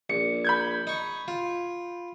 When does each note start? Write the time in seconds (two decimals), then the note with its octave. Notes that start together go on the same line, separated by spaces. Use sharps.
0.10 A#1 C#7
0.45 B5 G6 G#6
0.87 D#4 C#6
1.28 F4